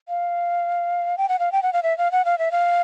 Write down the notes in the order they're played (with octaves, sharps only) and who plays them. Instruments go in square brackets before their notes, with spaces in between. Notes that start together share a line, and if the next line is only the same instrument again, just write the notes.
[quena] F5
G5
F#5
F5
G5
F#5
F5
E5
F5
F#5
F5
E5
F5